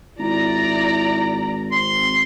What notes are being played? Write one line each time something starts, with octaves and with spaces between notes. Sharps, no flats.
G#1 E4 D5 A#5
C4 C6